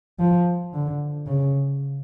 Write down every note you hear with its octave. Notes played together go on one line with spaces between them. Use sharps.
F3
D3
C#3